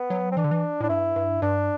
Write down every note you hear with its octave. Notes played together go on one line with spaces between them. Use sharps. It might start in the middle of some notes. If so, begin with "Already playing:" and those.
Already playing: B3
F#3
C4
E3 D4
D3
E3
A2 D4
G2 E4
G2
G2 D4